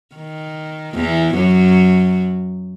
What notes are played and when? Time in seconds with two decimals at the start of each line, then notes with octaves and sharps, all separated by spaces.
0.15 D#3
0.95 E2 E3
1.34 F#2 F#3